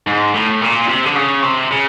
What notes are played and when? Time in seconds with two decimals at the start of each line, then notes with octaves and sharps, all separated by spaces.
0.07 G#2
0.34 A2
0.62 A#2
0.88 C3
1.05 D3
1.15 C#3
1.43 C3
1.71 C#3